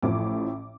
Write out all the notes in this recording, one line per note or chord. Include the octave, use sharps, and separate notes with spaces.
A1 A2 F3 D6